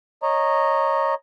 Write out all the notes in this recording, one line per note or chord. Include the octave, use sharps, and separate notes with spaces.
C#5 D#5 A#5